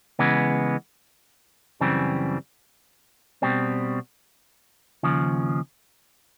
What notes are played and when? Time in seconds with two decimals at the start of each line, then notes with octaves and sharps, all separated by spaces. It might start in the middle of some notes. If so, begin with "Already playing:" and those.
0.19 C#3 E3 G#3 B3
1.80 F#2 C#3 E3 G3 C4
3.42 B2 G3 C4
5.03 D#2 C#3 F3